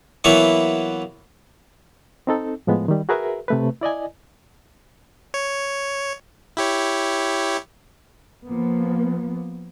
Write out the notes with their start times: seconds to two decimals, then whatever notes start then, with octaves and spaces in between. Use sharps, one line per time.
0.24 E3 F#3 A#3 B3 E4 C#6
2.27 C4 D#4 A4
2.67 A2 F3 G#3 B3
2.88 D#3 G3
3.09 F#4 G#4 A#4 B4 E5
3.48 C3 A3 B4
3.81 E4 D5 D#5 G#5
5.34 C#5
6.57 E4 G4 C#5
8.45 F3 A#3 B3